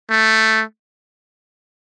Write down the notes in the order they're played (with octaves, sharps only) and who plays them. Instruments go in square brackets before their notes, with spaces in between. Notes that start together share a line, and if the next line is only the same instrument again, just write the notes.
[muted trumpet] A3